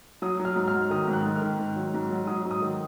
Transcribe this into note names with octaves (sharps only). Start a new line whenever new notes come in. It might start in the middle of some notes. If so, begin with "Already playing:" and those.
F#3 D#6
F#3
F6
G#2
F6
F#3
D#3 D#6
G#2
F#6
D#3
F6
D#3
G#2
F#3
G#2
F#3
F#3 D#6
G#2
D#6
D#3